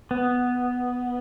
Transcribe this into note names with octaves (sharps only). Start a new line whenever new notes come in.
B3